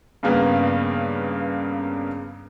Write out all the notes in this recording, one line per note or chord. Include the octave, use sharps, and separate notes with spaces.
G2 C#3 A#3 B3